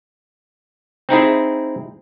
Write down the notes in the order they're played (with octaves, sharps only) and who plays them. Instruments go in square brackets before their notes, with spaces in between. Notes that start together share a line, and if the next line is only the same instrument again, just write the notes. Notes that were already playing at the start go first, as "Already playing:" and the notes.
[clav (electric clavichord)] C4 D#4 E4 G#4